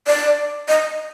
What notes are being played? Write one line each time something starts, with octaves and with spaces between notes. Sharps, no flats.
D5
D#5